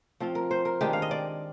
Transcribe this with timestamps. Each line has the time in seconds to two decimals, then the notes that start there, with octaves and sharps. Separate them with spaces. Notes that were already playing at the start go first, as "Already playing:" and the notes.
0.20 F3 C4 F4
0.35 A#4
0.51 C5
0.65 A#4
0.81 D#3 G#3 D4 G4
0.93 F5
1.02 D#5
1.11 D5